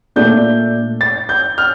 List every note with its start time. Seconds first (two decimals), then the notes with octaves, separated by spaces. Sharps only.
0.16 A#2 A3 D4 G6
1.01 A6
1.29 G6
1.58 F6